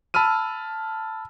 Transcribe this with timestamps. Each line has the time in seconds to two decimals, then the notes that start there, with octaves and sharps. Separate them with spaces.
0.14 A5 B5 E6 F6 D#7